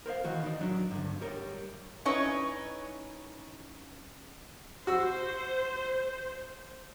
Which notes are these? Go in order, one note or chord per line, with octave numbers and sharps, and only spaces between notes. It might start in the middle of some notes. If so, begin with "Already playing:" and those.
A#4 C5 D5 F5
D#3 E3 F#4
D#4 D5
F#3 C#4 D4
G2 D3
G3 A#4 C#5
C#4 D#4 E4 B4 C#5
F#4 C5 E6